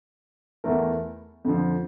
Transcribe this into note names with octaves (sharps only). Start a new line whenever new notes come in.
E2 E3 A3 E4 A#4
F2 D3 F3